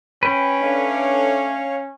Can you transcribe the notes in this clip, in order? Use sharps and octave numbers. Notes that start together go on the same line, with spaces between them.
C#4 B4 G5
A3 D4 C#5 F5